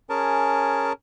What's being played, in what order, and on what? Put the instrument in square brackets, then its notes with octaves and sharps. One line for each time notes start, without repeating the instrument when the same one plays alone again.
[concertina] C#4 G#4 A#4 A5